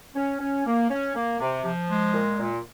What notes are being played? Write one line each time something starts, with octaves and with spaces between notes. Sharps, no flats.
C#4
C#4
A#3
C#4
A#3
C3
F3
G#3
A#2
A#2